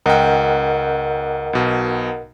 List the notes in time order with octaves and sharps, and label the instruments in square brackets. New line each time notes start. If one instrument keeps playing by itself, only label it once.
[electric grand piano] C#2 G5 [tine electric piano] A#4 D#5 F#5
[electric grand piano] B1 B2